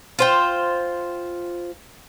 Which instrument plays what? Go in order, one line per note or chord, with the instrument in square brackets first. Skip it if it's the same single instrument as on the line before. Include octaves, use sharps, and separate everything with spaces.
[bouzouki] F4 C5 G5